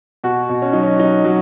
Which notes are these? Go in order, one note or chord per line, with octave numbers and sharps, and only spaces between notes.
B2 F#4
B2
C#4
F#3 D#4
C#4
F#3 D#4
F#3